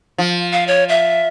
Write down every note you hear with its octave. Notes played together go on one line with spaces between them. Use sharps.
F3
F5
C#5
E5